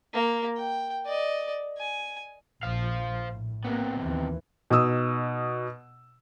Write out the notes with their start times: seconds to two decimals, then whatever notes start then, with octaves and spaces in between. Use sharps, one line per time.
0.14 A#3
0.57 G5
1.06 D5 D#5
1.78 G#5
2.63 A#1 C5 F5
3.31 A2
3.64 C3 A#3 B3
4.01 D#2 E3
4.70 B2 D#4 D#6 E6